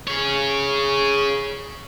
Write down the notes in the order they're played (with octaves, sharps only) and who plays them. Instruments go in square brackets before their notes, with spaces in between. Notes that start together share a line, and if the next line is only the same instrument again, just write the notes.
[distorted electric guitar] G#4 C#5